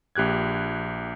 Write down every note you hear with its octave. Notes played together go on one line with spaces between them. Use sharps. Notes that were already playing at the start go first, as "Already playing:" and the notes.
A#1 G4 F#6 G#6